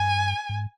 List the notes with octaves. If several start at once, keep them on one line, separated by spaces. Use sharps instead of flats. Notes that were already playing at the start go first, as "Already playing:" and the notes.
Already playing: G2 G#5
G#2